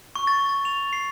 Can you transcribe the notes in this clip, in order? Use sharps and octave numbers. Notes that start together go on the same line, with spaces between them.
C#6
A6
A6
F7
C7